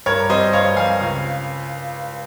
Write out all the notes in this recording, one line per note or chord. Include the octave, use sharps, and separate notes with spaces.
G2 A#4 C#5
G3 C4 C5 D#5
G2 C#5 F5
G3 C4 F5 G#5
C#2